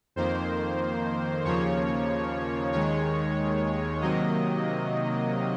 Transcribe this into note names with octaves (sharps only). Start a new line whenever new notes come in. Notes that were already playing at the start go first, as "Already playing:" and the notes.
F2 D#3 A#3 C5
D#2 C#3 F3 A#3 C#5
D#2 D#3 G#3 C#5
C3 D#3 F#3 A#3 D#5